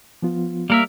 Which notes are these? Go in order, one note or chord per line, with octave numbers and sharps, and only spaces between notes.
F3 B3 F4
G3 A#3 A#4 E5